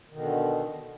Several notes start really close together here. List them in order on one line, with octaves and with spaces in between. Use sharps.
D#3 B2 D3